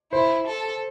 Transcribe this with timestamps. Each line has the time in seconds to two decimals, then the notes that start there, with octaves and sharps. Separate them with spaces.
0.12 E4 C5
0.47 A4